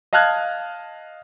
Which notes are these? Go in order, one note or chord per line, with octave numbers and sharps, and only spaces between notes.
D#5 F5 A5 F6 F#6 G#6